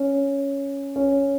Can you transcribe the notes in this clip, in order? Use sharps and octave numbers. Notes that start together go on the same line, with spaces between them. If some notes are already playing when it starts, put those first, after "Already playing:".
Already playing: C#4
C#4